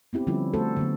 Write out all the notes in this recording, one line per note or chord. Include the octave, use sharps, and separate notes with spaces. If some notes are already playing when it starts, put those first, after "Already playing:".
B3 C4 E4 G4
D3 F3 G3 C#4 E4
G3 A3 F#4 A4 C5
D3 F#3 B3